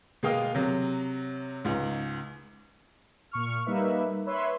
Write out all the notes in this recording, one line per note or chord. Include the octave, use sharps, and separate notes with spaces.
B2 G#3 A#3 F5 G5 D#6
C3 F#3
C#2 G#2
A#2 C#6 F6
G3 A#3 D#4 B4 E5
B4 C#5 E5 C6